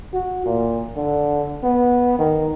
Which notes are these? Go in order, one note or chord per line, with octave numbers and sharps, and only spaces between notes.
F#4
A#2
D3
B3
D#3